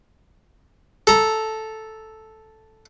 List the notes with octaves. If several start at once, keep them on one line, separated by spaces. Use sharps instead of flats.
A4 A#5